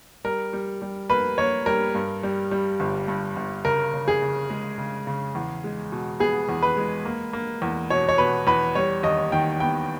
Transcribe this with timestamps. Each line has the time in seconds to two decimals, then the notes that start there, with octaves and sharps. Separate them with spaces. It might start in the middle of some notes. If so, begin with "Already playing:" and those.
0.24 G3 A#4
0.53 G3
0.82 G3
1.09 A#3 B4
1.38 A#3 C#5
1.66 G3 A#4
1.95 G2
2.23 G3
2.51 G3
2.80 G1
3.08 G2
3.36 G1
3.65 C#3 A#4
3.94 C#3
4.08 G#4
4.22 C#3
4.50 G#3
4.78 C#3
5.07 C#3
5.35 E2
5.64 G#3
5.92 B2
6.20 B3 G#4
6.49 E2
6.62 B4
6.77 G#3
7.05 A#3
7.33 A#3
7.62 E2
7.90 B2 C#5
8.09 C#5
8.18 B2 B4
8.47 E2 B4
8.75 G3 C#5
9.03 D#2 D#5
9.32 D#3 G5
9.60 B3 G5